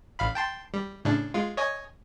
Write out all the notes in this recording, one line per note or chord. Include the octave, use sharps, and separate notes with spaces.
A1 F5 B5
G5 A5 C6
G3
A2 C#3 D4
G#3 F4
C#5 D#5 G#5